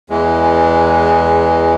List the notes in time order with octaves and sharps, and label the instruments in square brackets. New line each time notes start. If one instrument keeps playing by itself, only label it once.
[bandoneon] E2 E3 G#3